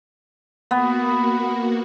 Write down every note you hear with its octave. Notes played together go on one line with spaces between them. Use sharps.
A#3 B3 F#4